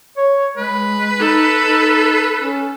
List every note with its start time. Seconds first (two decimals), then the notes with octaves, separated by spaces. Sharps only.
0.17 C#5
0.57 G#3 B4
1.19 D#4 A4
1.66 D#4
2.40 C#4